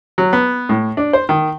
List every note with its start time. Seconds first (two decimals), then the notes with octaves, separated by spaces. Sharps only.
0.18 F#3
0.33 B3
0.69 A2
0.97 D4
1.13 C5
1.29 D#3